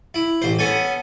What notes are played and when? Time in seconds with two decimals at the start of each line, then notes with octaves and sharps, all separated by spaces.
0.14 E4
0.42 A1 C5
0.59 B3 C#4 A4 G#5